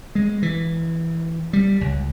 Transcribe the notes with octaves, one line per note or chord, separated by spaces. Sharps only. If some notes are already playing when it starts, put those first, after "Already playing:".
G#3
E3
G3
C#2